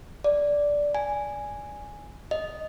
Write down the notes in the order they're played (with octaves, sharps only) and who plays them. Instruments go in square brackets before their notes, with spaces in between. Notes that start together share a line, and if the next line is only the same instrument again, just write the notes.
[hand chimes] D5
G#5
D#5